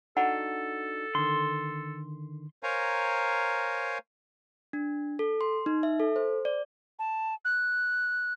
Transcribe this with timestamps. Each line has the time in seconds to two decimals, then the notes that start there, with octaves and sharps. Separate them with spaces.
0.17 D4 D#4 F#4 A4 F#5
1.15 D3 D#3 C6
2.63 A#4 C5 C#5 F5 G#5 A#5
4.73 D4
5.19 A4
5.41 C6
5.66 D#4
5.83 E5
6.00 A4
6.16 C5
6.45 D5
6.99 A5
7.45 F#6